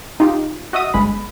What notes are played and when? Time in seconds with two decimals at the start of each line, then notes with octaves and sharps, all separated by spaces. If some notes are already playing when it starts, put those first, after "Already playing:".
0.20 D#4 F4 G4
0.73 F#4 D#5 E5 D#6
0.94 G1 G#3 B5